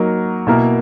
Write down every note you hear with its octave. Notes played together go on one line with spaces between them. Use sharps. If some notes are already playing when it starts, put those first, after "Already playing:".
Already playing: F#3 A#3 D#4 F#4 A#4
B2 A#3 E4 A#4